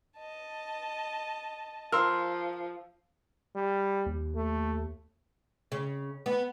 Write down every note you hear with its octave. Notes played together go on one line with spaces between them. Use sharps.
D#5 A5
F3 A#4 C6 E6 F6
G3
D#2
A3
C#3
B3